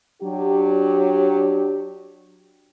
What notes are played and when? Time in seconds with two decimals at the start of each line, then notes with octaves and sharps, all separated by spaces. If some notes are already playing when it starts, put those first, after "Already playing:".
0.22 F#3 D4 G4